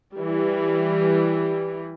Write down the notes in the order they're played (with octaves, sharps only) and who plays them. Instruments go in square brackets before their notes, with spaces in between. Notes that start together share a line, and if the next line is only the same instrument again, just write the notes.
[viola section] E3 G3